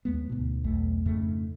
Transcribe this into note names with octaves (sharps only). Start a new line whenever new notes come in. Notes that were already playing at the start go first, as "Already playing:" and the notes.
D#2 G#3 B3
D2 G#2 B2
B1 E2 A3
F2 G#2 C#3 A3